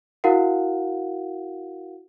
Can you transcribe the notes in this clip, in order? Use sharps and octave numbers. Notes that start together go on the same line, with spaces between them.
E4 F#4 A#4 F5 F#5